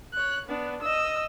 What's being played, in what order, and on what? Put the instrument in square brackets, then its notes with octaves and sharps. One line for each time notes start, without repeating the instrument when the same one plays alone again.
[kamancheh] C#5 F#6
B3 D4
D#5 E6